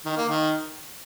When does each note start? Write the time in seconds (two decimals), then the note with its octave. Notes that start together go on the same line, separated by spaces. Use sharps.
0.05 D#3
0.17 A#3
0.29 D#3